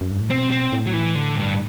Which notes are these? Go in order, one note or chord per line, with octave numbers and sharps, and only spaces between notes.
F#2
G2
A2
B2 C4
C4
A2
F#3
E3
D3
G2